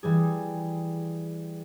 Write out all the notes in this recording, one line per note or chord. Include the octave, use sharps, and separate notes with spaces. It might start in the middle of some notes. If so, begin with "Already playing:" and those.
E3 G3 G#4